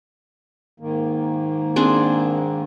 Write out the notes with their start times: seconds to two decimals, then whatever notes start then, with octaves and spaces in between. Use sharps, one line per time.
0.80 G#2 D#3 A#3
1.76 C4 D4 G#4